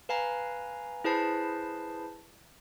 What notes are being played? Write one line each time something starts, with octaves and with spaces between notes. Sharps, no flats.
B4 F5 G#5 A#5
E4 G#4 B4 C5 A5 C7